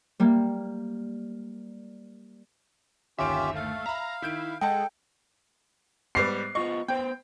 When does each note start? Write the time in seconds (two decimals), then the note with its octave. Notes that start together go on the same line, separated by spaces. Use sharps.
0.20 G3 A#3
3.18 G1 D#2 C#4 F4 G4 E5 D7
3.55 A3 F5
3.86 E5 A#5 B5
4.22 D#3 E4 G6 D7
4.61 G#3 A4 D#5 F#5 G5 A5
6.15 G#2 G3 B3 C7
6.55 B3 F4 D#5 C#6
6.88 B3 C5 G5